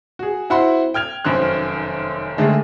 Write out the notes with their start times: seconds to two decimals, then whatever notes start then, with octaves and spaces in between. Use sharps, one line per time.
0.19 F#4 G#4
0.50 C4 E4 F#4 F#5 B5 C6
0.94 G5 F6 G#6 F7
1.25 F1 F#2 D#3 C5 F#6
2.38 D3 D#3 G#3 A3